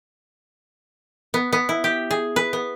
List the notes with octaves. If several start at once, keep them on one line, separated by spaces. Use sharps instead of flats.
B3
B3
E4
G4
G#4
B4
B3